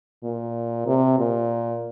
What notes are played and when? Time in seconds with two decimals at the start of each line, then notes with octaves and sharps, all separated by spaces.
0.24 A#2
0.87 C3
1.19 A#2